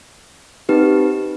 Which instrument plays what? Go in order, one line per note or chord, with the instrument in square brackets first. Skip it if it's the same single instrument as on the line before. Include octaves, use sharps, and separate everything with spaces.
[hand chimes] C4 D#4 G4 B4